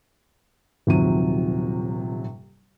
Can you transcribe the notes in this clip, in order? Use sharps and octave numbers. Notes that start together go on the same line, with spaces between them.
D#1 D#2 C3 F3 F#3 D#7